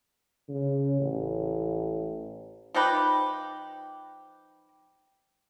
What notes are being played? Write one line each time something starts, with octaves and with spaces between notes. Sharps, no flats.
C#3
A1
F3 D#4 G4 B4